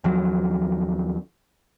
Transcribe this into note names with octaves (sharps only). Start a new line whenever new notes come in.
D#2 F3 F#3